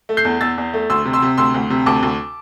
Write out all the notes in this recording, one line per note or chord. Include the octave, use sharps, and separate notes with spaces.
A3
G6 C7
E2
E2 E6 A6
E2
A3
D2 C6 E6
C3
C6 E6
C3
D2 C6 E6
D2
C3
D2 A5 D6
D2